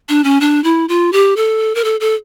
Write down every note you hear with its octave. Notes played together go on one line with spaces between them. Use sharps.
D4
C#4
D4
E4
F4
G4
A4
A#4
A4
A4